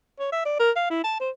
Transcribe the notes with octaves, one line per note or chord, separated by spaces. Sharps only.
C#5
E5
D5
A#4
F5
E4
A5
C5